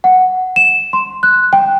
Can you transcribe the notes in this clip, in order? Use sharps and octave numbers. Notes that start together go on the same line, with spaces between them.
F#5
E7
C6
F#6
G5